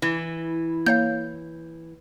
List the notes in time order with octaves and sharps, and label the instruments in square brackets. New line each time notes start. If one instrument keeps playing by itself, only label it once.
[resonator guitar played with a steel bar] E3 [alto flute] E4
[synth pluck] A#3 C#5 F5 [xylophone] G6